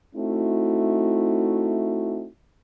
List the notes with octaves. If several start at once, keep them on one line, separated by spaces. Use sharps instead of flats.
A3 C4 D#4 E4 F#4